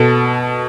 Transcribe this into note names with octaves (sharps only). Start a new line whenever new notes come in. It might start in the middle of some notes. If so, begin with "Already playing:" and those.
Already playing: B2 A4